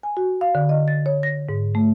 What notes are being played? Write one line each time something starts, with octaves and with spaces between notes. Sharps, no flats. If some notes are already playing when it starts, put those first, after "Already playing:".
G#5
F#4
F5
D3
D#5
A6
C#5
A#6
G#2
A3